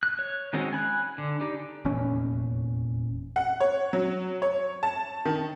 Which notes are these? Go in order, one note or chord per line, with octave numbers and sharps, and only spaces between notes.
F#6
C#5
D#3 G#3 C4 C#4 F#4
G#5 B5 F#6
D3
D#4 G4 D5
F1 E2 A#2 C#4
F#5
C#5
F#3
C#5
A5
D#3